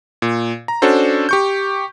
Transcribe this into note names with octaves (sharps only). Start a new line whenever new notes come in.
A#2
A#5
C#4 D4 F#4 A4 C5
G4 C#6 G6